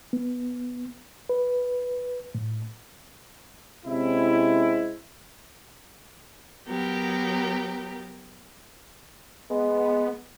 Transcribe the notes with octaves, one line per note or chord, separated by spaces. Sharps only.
B3
B4
A2
C3 G#3 C4 C#4 E4
F#3 B3 G4 A#4
G#3 B3